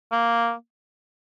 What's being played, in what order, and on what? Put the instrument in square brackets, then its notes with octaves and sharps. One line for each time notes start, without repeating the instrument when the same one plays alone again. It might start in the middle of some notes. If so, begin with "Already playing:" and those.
[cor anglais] A#3